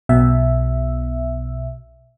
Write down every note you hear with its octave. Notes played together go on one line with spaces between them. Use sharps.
B1 B2 E5